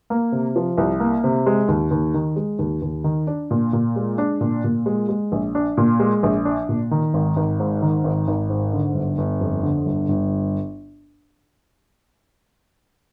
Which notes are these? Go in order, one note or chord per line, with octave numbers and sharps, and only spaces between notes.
A#3
C3
F3
C2
A#3
C3
G#3
D#2
D#2
D#3
G#3
D#2
D#2
D#3
D4
A#2
A#2
G#3
D4
A#2
A#2
G#3
G#3
A#1
D4
A#2
G#3
A#1
D4
A#2
D#3
G#1
G#1
G#2
D#3
G#1
G#1
G#2
D3
G1
G1
F2
D3
G1
G1